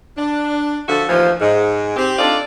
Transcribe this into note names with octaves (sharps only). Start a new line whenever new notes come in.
D4
D3 F3 F#4 A4 E5
D#2 A2 E3 F3
G#2
C4 G4
D4 D#4 F4 A4 D5